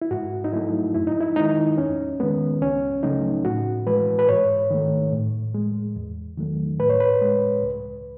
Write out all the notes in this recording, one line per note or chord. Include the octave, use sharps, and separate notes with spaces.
E4
G#2 F#4
D#4
F#3 A3 E4
F#2 E4
D#4
E4
D#3 G#3 D#4
E2 C#4
D#3 G#3 B3
C#2 C#4
C#3 F#3 A3 D#4
A2 F#4
E3 G#3 B4
B4
G#2 C#5
D#3 A3
A2
G#3
E2
D#3 F#3 A3
A2 B4
C#5
B4
G#3
C#2